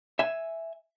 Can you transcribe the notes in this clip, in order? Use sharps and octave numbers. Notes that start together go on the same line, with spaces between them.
E5 G#5